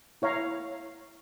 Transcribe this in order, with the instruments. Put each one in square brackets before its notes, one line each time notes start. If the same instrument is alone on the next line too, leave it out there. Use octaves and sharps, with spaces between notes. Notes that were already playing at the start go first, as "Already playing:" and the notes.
[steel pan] E4 C#5 F5 A#5